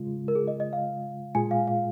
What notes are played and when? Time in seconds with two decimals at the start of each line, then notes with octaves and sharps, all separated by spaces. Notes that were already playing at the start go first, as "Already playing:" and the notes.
Already playing: C#3 G#3 F4
0.28 A#4
0.35 G#4
0.48 D#5
0.60 D#5
0.73 F5
1.35 A#2 G#3 F4 G#4 G#5
1.51 F5
1.68 F5